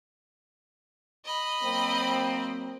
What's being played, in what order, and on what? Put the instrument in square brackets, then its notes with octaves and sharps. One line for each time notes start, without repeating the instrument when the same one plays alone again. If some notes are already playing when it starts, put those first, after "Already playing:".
[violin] D#5 B5
[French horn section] F#3 A#3 C4